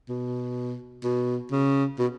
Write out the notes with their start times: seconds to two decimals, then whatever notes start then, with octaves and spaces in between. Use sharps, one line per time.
0.09 B2
1.04 B2
1.51 C#3
1.99 B2